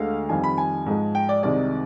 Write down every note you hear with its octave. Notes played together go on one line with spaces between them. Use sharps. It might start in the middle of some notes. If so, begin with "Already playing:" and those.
Already playing: D2 D3 G#3 F5
F2 D#3 G3 G#5
B5
G#5
G#2 F3 G#3
G5
D5
C2 C3 D#3 G#3 D5